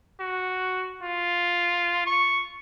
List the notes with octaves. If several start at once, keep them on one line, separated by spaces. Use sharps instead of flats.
F#4
F4
C#6